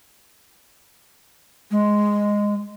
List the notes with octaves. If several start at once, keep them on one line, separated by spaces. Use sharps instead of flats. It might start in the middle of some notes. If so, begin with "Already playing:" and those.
G#3